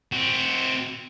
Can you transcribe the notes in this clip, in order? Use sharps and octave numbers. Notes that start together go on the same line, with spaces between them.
C4 F#4